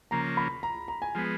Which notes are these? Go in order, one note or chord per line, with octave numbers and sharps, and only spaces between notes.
C#3 F3 A#3 A#5
B5
A#5
A#5
G#5
F3 G#3 B3